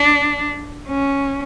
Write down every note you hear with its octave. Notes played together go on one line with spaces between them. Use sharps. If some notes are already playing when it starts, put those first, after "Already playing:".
Already playing: D4
C#4